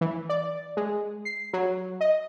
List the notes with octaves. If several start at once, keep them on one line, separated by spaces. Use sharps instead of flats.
E3
D5
G#3
C7
F#3
D#5